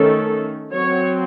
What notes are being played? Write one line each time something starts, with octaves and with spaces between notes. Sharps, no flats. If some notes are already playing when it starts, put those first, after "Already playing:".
Already playing: D#3 A3 C#4 A4
F#3 C4 C#5